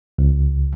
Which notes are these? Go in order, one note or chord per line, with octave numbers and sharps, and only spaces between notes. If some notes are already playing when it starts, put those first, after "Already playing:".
C#2